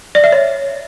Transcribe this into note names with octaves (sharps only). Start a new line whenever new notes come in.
D5
E5
C#5